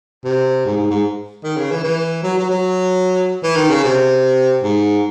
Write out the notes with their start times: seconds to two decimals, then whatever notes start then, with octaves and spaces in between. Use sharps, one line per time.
0.24 C3
0.65 G#2
0.77 G#2
0.91 G#2
1.44 D#3
1.57 C#3
1.71 E3
1.84 E3
2.23 F#3
2.38 F#3
2.50 F#3
3.43 E3
3.56 D#3
3.70 C#3
3.84 C3
4.63 G#2